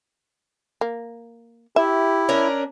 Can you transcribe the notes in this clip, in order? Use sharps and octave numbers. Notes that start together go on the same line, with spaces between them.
A#3
E4 G4 E5
C#4 D4 A#4